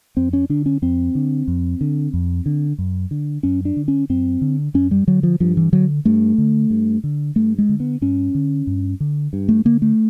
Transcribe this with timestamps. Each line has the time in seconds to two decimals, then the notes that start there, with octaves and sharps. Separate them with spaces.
0.17 F2 C4
0.33 C#4
0.49 D3 D4
0.66 C#4
0.82 F2 C4
1.15 D3
1.48 F2
1.81 D3
2.14 F2
2.46 D3
2.78 F#2
3.11 D3
3.43 F#2 C#4
3.65 D4
3.76 D3
3.88 C#4
4.09 F#2 C4
4.41 D3
4.74 F#2 C#4
4.91 G3
5.07 D3 F#3
5.23 F3
5.40 G2 F3
5.57 E3
5.72 D3 F#3
6.05 G2 A3
6.38 D3
6.70 G2
7.04 D3
7.36 G2 A3
7.58 G#3
7.69 D3
7.80 B3
8.01 G2 C#4
8.35 D3
8.67 G2
9.00 D3
9.33 G2
9.49 A3
9.65 D3 A#3
9.82 A3